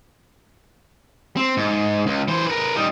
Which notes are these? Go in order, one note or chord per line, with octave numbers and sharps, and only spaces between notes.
C4
G#2
C#2
E3 C5
A#4 B4
G3 D#4